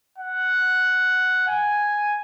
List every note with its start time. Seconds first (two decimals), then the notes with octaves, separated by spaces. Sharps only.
0.18 F#5
1.48 G#5